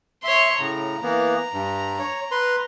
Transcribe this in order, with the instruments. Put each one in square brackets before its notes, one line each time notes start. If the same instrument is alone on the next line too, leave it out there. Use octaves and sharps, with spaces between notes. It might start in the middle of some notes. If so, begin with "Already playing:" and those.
[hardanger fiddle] C#5 C6 [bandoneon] E5
[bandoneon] A2 C#3 [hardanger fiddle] A#5
[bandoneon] E3 A#3 B3
G2
C#5
B4 C6